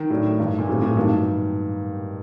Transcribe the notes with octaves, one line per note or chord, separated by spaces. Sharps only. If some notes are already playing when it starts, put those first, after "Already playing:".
Already playing: D#3
A2 F#3 A3 D4
G2 D#3 A3 D#4
A#2
A2 F#3 A3 C4 G4
A2
G2 D#3 F#3 A#3 D#4 G4